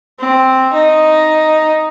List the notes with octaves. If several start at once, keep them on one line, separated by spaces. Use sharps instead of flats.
C4
D#4